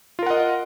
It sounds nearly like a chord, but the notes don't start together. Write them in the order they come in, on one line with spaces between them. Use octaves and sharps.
F4 A#4 F#5 D#5